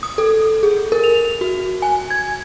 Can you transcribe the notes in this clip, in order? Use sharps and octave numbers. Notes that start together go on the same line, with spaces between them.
D#6
A4
G#4
A#4
F7
F#4
G#5
G#6